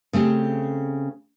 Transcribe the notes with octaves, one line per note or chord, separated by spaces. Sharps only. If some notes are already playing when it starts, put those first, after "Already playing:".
C#3 A3 C4 G4